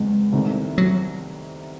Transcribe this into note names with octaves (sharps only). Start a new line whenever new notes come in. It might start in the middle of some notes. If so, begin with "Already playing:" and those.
Already playing: F#1 E2 C3 G#3
C2 C3 D#3 A3
F#3